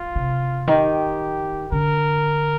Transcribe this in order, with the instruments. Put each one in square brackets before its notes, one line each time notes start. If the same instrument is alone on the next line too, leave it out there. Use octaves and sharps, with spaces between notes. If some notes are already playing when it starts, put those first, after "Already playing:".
Already playing: [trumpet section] F4
[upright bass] C3
[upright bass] D#3 [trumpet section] G4
[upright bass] D3 [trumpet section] A#4